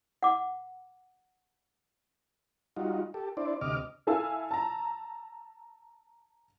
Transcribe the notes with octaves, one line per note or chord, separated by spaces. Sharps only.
F#5 D6
G3 D#4 F4 F#4
G4 A4
D4 E4 C5 D5
D2 C3 D#5 D6 F6
E4 A4 F5 G#5 E6
A5 A#5